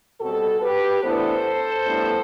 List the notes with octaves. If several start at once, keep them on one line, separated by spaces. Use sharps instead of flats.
B2 G3 C4 F#4 A4
G4 B4
A2 E3 B3 D4 A4 C5
A2 G3 B3 D4